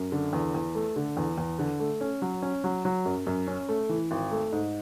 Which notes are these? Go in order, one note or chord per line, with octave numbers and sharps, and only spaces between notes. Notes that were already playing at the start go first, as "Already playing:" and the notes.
Already playing: F#2
D3
E2
E2
A3
D3
E2
E2
D3
A3
C#4
F#3
C#4
F#3
F#3
F#2
F#2
C#4
A3
E3
G#1
A3
G#2